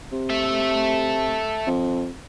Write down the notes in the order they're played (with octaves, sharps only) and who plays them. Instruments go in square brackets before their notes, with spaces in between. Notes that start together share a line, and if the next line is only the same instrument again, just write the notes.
[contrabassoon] C3
[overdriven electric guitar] A4 E5
[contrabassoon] F2